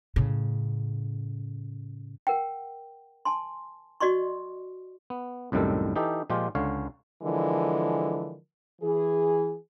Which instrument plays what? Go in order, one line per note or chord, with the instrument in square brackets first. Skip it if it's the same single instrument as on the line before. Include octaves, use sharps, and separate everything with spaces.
[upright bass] A2 C#3
[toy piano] A#4 F#5 G5
G#5 A5 C6
F#4 D5 D#5 C6 C#6
[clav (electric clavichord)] B3
C2 F#2 A2 D#3 G3 A4
E3 D#4 G4 A4
A#2 F3 G#3 F4 G4
C#2 D3 C#5 F5
[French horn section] D3 E3 F3 G#3 A#4
E3 G#4